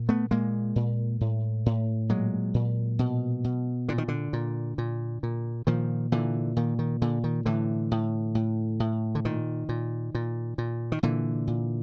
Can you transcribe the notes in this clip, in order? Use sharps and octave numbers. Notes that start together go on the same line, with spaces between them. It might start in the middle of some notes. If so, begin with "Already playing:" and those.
Already playing: A#2
A3 B3
A#2 G#3 A#3
A#2
A2
A2
A#2 F#3 G#3
A#2
B2
B2
A#2 D3
D#3
D3
A#2
A#2
A#2
A#2 D#3 F3
A#2 D3 E3
A#2 D#3
D#3
A#2 D3
D#3
A2 D3 E3
A2
A2
A2
D3
A#2 D#3
A#2
A#2
A#2
D#3
A#2 D3 E3
A#2